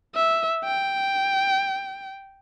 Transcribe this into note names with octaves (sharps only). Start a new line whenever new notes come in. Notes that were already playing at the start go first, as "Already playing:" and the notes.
E5
G5